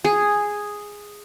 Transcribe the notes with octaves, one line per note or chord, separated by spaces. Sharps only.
G#4